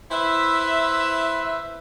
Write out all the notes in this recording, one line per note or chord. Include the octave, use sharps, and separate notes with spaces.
E4 B4 C5 E5